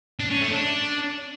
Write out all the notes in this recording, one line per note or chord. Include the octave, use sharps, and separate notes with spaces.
D4
C#4
A3
D4